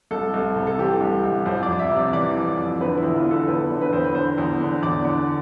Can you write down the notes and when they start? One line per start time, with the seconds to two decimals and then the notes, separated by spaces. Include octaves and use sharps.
0.11 C2 A4
0.34 C2
0.56 C3
0.67 A4
0.78 E3 G4
1.01 C2
1.23 C2
1.46 F2 C5
1.63 D5
1.68 F2
1.79 E5
1.91 C3
1.97 D5
2.13 E3 D5
2.36 F2
2.58 F2
2.81 D3 B4
2.97 E4
3.03 E2
3.14 F4
3.25 D3
3.31 A4
3.48 E2 B4
3.70 D3
3.81 B4
3.93 E2 C5
4.04 B4
4.15 D3 C5
4.38 E2
4.60 D3
4.83 E2 D5
5.05 D3